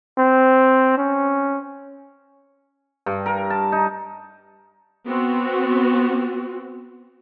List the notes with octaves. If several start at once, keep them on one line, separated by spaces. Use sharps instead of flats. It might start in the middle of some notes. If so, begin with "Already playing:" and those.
C4
C#4
G2
A#4
A5
D#4
B3 C4 F#4